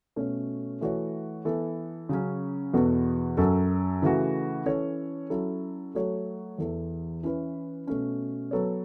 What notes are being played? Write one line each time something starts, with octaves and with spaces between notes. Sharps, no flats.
B2 A3 C#4 A4 C#5
E3 A3 F#4 C#5
E3 B3 A4
C#3 F#3 C#4
E2 B2 B3 F#4 A4
F#2 F#3 C#4 A4
C#3 E3 A3 F#4
E3 C#4 A4 C#5
F#3 C#4 E4 A4
F#3 A3 F#4 A4 C#5
E2 E3 B3 A4
E3 C#4 E4 B4
B2 A3 C#4
F#3 B3 A4 C#5